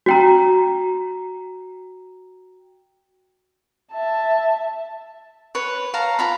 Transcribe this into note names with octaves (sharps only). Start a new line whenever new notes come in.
F#4 G5 A#5
E5 A5
B4 C#5
F5 A5 A#5
F4 A#5 B5